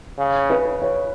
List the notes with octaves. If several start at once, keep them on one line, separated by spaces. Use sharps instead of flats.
C#3
B4
C#5